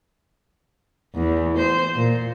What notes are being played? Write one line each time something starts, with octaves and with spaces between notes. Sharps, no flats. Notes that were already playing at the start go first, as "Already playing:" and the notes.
E2
C5
A#2